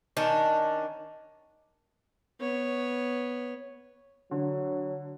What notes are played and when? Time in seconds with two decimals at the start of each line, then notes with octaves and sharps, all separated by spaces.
0.17 D#3 C#4 D4
2.40 B3 C#5
4.31 D3 F#3